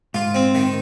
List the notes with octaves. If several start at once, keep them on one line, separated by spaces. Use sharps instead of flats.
G#2 F4
C4
D#3